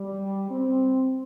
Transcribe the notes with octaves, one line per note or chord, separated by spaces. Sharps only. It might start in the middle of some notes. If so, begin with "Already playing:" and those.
Already playing: G3
C4